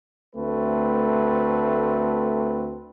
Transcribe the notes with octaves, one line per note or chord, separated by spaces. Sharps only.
D2 A3 C4 B4